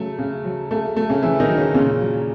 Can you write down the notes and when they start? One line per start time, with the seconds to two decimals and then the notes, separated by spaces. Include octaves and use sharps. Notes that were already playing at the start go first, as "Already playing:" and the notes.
Already playing: C#3 F#3 A3
0.19 C#3
0.45 F#3
0.70 C#3 A3
0.96 F#3 A3
1.10 C#3 C#4
1.22 C#3 E3 E4
1.40 D#3 D#4
1.49 F#3
1.57 C#3 C#4
1.74 A#2 C#3 C#4
2.01 F#3